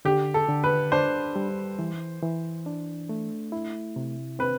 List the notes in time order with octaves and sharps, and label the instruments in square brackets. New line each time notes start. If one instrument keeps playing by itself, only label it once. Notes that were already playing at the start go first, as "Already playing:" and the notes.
[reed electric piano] D3 [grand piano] G4
[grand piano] A4
[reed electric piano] D3
[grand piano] B4
[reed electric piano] D4 [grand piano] C5
[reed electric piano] G3
E3
E3
D4
A3
E4
C3
[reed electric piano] C4 [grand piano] B4